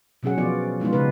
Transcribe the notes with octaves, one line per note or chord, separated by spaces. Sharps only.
B2 F#3 C#4 G#4 F#5
F3 B3 F4 D5
F3 G#3 B3 D#4 F4
C#3 B3 B4